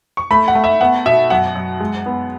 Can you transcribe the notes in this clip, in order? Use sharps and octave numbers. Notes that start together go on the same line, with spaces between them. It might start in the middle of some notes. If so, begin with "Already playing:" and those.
C#6
A3 B5
F#5
A3
E5
B3 F#5
B2 E5
F#2 F#5
F#2
G#3
B3